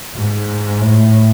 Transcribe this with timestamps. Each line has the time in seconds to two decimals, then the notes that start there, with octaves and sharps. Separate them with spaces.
0.17 G#2
0.80 A2